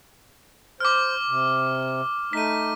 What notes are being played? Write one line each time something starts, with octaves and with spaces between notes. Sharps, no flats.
C5 D6 F6
C3
A3 D#4 B6 D#7